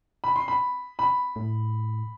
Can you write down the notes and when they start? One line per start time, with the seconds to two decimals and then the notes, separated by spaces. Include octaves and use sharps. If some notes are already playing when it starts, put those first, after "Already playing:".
0.24 B5
0.36 C6
0.48 B5
0.99 B5
1.36 A2